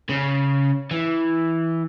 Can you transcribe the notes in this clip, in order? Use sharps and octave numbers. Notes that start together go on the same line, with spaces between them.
C#3
E3